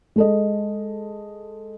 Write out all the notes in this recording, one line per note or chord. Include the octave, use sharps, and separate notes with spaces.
G#3 A4 D#5